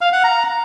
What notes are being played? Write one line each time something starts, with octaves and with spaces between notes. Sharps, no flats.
F5
F#5
A#5